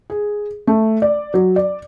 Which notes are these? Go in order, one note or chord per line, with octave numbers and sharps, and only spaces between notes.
G#4
A3
D5
F#3
D5